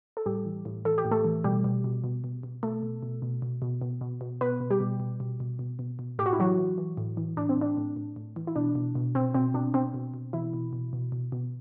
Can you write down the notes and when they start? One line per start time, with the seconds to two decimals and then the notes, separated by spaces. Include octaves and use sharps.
0.17 A4
0.26 A2 G3 G4
0.45 E3
0.65 A2
0.85 E3 A4
0.98 G4
1.05 A2
1.11 A3 A4
1.25 E3
1.44 B2 G3 G4
1.64 B2
1.84 B2
2.04 B2
2.24 B2
2.43 B2
2.63 B2 A3 A4
2.83 B2
3.03 B2
3.22 B2
3.42 B2
3.62 B2
3.82 B2
4.01 B2
4.21 B2
4.41 B2 B3 B4
4.60 B2
4.70 G3 G4
4.80 B2
5.00 B2
5.20 B2
5.40 B2
5.59 B2
5.79 B2
5.99 B2
6.19 A2 G4
6.26 F#4
6.33 E4
6.39 E3 F#3 F#4
6.58 E3
6.78 E3
6.97 A2
7.17 E3
7.37 A2 D4
7.49 C4
7.57 A2 D4
7.77 A2
7.96 A2
8.16 A2
8.36 E3
8.47 E4
8.56 B2 D4
8.75 B2
8.95 B2
9.15 B2 C4
9.34 B2 C4
9.54 B2 D4
9.74 B2 C4
9.94 B2
10.14 B2
10.33 B2 E3 E4
10.54 B2
10.73 B2
10.93 B2
11.12 B2
11.32 B2